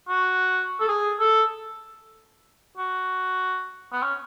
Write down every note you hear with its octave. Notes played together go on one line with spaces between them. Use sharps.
F#4
A4
G#4
A4
F#4
B3
C#4